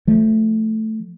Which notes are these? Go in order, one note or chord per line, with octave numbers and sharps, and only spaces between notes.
F3 A3